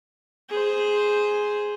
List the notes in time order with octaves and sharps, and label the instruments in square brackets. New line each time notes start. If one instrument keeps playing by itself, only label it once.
[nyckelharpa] G#4 C5